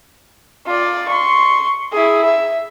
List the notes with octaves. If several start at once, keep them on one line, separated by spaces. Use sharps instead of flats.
F4 D5
C6 C#6
E4 G#4
E5